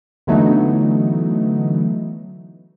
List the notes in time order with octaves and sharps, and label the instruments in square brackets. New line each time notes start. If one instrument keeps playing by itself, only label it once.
[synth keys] D3 E3 F#3 A3 B3 D#4